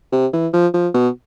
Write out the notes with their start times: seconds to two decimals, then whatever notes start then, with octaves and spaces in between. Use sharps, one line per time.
0.12 C3
0.33 E3
0.53 F3
0.74 F3
0.94 B2